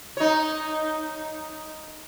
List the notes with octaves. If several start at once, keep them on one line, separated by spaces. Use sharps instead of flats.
D#4 C#5